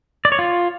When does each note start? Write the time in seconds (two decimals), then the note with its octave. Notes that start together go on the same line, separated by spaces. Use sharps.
0.25 D5
0.32 C#5
0.39 F4